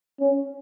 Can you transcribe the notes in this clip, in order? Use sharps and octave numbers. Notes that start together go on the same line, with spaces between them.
C#4